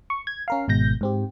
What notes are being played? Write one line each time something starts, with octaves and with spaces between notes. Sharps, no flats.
C#6
G#6
C#4 A#4 F5
G#1 B2 G#3 G6 A#6
G#2 C4 G4